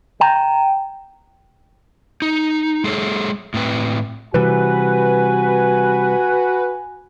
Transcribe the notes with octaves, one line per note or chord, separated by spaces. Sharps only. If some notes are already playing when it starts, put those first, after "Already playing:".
G5 A#5
D#4
G#3 G#4 A4 C#5
A2 C4 B4
C3 E3 G3 F#4 B4 G#5